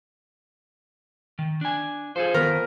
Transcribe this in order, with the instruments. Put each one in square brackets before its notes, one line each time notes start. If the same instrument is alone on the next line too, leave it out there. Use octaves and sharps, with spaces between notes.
[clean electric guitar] D#3
D4 G#5
[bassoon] F3 [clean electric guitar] G#4 A4 C5
[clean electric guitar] D#3 B3 [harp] A#4